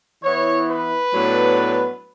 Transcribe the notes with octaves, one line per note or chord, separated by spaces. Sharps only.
E3 B3 E4 C#5
B4
A2 F#3 B3 D4